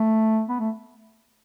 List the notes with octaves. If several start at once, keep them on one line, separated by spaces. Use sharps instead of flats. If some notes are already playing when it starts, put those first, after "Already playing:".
Already playing: A3
B3
A3